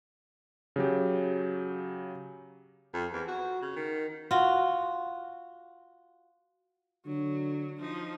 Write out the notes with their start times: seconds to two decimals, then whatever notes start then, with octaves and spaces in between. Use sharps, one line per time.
0.76 C#3 F#3 G4
2.94 F2
3.13 E2
3.28 F#4
3.61 C#3
3.76 D#3
4.31 F4 F#4
7.06 D3 F#3
7.80 F3 D#4